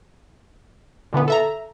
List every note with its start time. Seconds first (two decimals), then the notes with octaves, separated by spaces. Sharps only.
1.13 A#2 D3 E3 B3
1.28 A4 E5 A#5